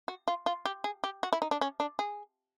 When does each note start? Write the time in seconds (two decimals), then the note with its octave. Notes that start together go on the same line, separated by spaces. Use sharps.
0.08 F#4
0.28 F4
0.46 F4
0.65 G4
0.84 G#4
1.04 G4
1.23 F#4
1.33 E4
1.42 D#4
1.51 D4
1.61 C#4
1.80 D4
1.99 G#4